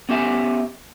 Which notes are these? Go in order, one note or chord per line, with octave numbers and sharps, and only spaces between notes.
B3 C#4 G4 E5 G#5